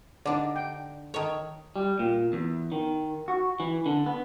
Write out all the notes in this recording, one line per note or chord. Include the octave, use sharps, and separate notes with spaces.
D3 D4 D#4 D5
G5
D#3 A4 C#5
G3
A#2
E2
D#3
F#4
E3
D3
B3